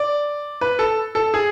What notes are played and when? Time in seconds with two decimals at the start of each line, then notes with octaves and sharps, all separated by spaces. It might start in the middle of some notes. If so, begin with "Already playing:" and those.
Already playing: D5
0.61 B4
0.79 A4
1.15 A4
1.34 G#4